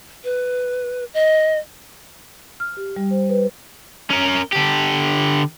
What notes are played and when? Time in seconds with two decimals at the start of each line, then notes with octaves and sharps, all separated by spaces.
0.24 B4
1.14 D#5
2.60 F6
2.77 G4
2.96 G3
3.11 C5
3.29 B4
4.10 C#4 A#4
4.52 D3 G4